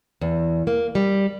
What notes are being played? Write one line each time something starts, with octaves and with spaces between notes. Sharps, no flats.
E2
A#3
G3